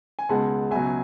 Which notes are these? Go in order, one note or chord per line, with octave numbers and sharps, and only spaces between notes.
G#5
C#2 B2 G#3 F#5 A5
C#2 B2 F#3 E5 G#5